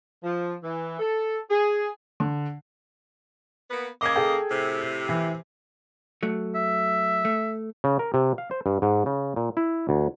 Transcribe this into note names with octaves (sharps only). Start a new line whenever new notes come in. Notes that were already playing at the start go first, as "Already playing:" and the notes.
F3
E3
A4
G#4
D3
A#3 B3
C#3 A#3 D#5 D6 G#6
G#4 A4 G5
A2 C3
E3
F#3 A3
E5
A3
C#3
A#4
C3
F5
C5
G2
G#2
C#3
A#2
E4
D2